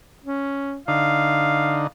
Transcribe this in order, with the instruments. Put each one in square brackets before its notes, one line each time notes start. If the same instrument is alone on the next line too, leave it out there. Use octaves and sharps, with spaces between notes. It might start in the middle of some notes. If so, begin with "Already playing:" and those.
[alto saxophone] C#4
[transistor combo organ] D3 D#4 [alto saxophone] F5